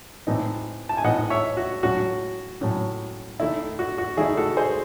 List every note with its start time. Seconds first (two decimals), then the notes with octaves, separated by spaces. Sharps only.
0.27 A2 E3 C4 D#4
0.89 A5
0.97 G#5
1.04 A2 E3 C4 D#4 D#5 F#5
1.30 C#5 E5
1.57 F#4
1.83 A2 F#3 C#4 F#4
2.61 A2 F#3 C#4
3.40 D#3 A3 D#4 E4
3.79 F#4
3.98 F#4
4.17 D#3 A3 D#4 E4 G#4
4.37 F#4 A4
4.57 G#4 C5